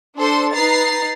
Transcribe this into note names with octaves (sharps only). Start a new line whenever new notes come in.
D4 A4 C5 C6
D#4 B4 A#5 A6 C7